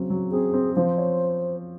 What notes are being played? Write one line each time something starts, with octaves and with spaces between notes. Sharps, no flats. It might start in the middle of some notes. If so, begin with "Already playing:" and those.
Already playing: C#3 F#3 C4
F#3
C4 G#4
C4
F3 C5
C#5